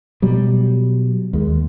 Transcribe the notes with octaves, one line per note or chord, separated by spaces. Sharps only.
B2 F#3 G3
D#2 G#3